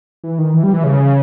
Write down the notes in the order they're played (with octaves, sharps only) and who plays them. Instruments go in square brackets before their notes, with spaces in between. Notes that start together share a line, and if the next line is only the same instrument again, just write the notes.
[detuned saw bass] E3
D#3
E3
G3
E3
C#3